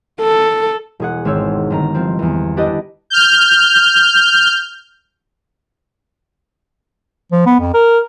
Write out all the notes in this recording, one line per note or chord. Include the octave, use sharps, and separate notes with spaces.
A4
E1 G#4 F#5
G#1 C4 C#5 E6
G1 D#3 A#5
F3 C4
E2 E3
D4 E4 G4 B4 D5 D#5
F6 G6
F3
B3
F2
A#4